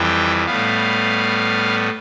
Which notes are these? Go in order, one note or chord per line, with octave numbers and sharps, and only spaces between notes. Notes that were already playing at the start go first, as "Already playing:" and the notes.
Already playing: F2 E3 G3 G5
A2 G3 B3 F5